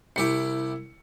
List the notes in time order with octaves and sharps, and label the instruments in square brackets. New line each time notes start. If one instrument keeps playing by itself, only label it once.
[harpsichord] C2 G4 G5 [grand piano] E4 C#7